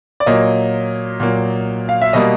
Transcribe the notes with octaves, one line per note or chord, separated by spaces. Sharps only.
D5
A#2 F#3 A#3 D#5
A#2 F#3 A#3
F5
E5
B2 G3 A#3 D#5